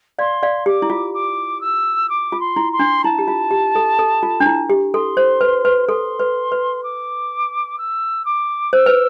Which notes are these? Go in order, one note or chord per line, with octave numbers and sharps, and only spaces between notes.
D5 F5 C6
D5 F5
G4 D6
E4
F4
D6
E6
D6
F4
C6
E4
C6
D4
E4 A5
G4
F4
G4
A4
A4
F4
D4
E4
G4
A4 C6
C5
B4
B4
A4 C6
B4
B4
D6
E6
D6
C5 E6
B4